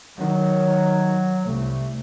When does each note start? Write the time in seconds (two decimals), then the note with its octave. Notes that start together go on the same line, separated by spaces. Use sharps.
0.18 D#3 F#3
1.46 C2 A3